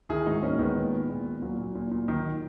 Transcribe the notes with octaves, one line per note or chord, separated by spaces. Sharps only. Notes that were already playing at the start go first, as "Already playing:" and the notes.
D#3 E4 G#4
G#2 D#4 F#4
G#2 A#3 C#4
D#3 G#3 B3
A#2
A#2
A#2
A#2
A#2 F#3 A#3
A#2
A#2
A#2
D#3